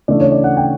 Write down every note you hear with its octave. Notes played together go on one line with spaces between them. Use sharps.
C#3 E3 A3 D4 D5
C#5
D5
F#5
G5